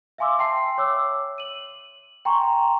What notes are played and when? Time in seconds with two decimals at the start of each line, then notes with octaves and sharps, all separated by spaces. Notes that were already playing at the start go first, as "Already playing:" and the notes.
0.18 E5 F5 G#5 C6 D6 E6
0.39 E5 G5 A5 C6 C7
0.78 C#5 D6 E6
1.38 D#7 F#7
2.25 G5 G#5 A#5 C6 C#6